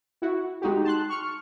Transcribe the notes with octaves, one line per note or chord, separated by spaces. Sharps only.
E4 F#4
G#3 D#4 F#4 G4
A5 C6 F#6
C#6 F6 C#7